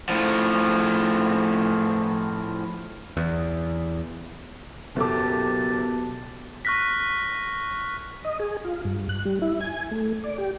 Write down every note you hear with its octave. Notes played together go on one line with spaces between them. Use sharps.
A2 F3
E2
F#1 B2 G4 A4 A5 D6
C#6 F6 F#6 A#6 B6
D#5
G#4
F4
G2
F#6
G3
E4
G#5
A3
D5
G4